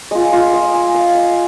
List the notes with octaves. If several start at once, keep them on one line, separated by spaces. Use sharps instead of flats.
G#3 F4 D#5
F4
D#5
G#5
F5
D#5